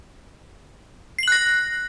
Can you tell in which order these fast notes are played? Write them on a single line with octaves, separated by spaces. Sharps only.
C7 F#7 F#6 A#6